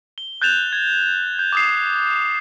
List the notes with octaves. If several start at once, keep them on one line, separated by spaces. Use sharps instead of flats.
G7
F#6 G6 A6 E7 F7
G#6
G6
D6 D#6 C7